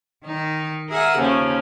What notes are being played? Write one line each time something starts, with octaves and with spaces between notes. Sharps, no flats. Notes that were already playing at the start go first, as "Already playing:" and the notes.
D#3 D#4
G#4 A#4 E5 F#5
D#2 C#3 F3 C#4